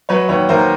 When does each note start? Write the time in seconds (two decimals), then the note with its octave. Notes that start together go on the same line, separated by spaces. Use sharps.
0.09 F#3 B4 C#5
0.29 D#2 B4 C#5
0.49 D#2 A#4 C5